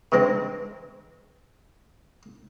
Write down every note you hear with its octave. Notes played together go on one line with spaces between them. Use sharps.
C3 E3 G#3 C4 D4